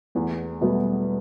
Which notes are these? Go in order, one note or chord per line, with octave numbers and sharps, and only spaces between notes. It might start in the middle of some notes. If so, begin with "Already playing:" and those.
E2 A3 B3
B2 F#3 G3 A3 B3